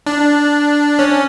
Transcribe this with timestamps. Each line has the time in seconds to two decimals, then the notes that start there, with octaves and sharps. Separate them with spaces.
0.07 D4
0.99 C#4